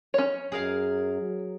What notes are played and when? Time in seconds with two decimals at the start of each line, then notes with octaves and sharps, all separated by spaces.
0.14 C#4 C#5
0.52 F#2 G#4 A#4 F5
1.21 F#3